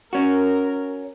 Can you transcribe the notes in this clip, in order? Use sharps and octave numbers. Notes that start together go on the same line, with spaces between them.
C#4 F#4 A#4